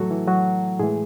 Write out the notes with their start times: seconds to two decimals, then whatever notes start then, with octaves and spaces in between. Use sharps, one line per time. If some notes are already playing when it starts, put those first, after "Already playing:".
Already playing: A2 E3 F#3 A3 F#4 A4
0.10 E3 E4
0.27 F#3 F#4
0.79 A2 E3 G#3 G#4